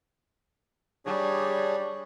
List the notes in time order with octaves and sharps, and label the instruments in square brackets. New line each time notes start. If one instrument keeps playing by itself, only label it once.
[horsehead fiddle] G3 [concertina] D4 G#4 C#5